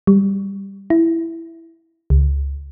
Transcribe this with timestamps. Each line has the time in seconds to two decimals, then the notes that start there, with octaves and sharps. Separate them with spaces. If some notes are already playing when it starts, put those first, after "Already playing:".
0.07 G3
0.90 E4
2.10 C#2